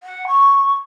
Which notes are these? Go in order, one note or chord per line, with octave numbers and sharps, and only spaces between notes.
F#5
C#6